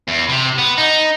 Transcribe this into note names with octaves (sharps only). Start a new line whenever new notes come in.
E2
C3
B3
D#4